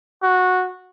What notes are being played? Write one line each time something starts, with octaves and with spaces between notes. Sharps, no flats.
F#4